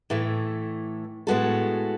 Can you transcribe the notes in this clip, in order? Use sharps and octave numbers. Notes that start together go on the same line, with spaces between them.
A2 E3 A3
A2 G#3 B3 F#4 A4